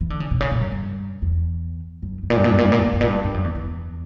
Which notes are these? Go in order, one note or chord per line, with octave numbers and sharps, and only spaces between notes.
E3
D3
C#3
B2
C#3
A#2
F#2
G2
E2
F#2
G2
A#2
G2
A#2
G2
A#2
G2
A#2
G2
A#2
G2
A#2
G2
G2
F#2
E2
E2